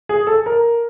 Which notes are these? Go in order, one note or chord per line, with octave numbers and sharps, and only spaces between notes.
G#4
A4
A#4